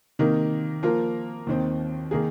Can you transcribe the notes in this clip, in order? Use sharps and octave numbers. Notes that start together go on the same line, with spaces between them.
C3 D#3 A#3 D#4
F3 A#3 F4 A#4
D#2 D#3 C4
D#3 A#3 G#4